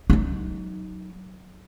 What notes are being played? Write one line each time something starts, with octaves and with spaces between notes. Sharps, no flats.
F#3 D#4